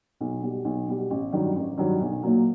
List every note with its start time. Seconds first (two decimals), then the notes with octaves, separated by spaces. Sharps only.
0.20 B1
0.42 B2 G3
0.65 B1
0.88 B2 G3
1.10 A1
1.32 G2 D#3 F#3
1.56 A1
1.78 G2 D#3 F#3
2.01 B1
2.23 A#2 F#3 A#3